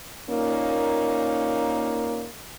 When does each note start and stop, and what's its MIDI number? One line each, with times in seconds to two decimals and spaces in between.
0.28 2.27 46
0.28 2.27 58
0.28 2.27 61
0.28 2.27 63